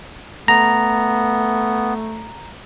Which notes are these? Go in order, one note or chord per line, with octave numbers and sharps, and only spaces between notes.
A3 B3 A#5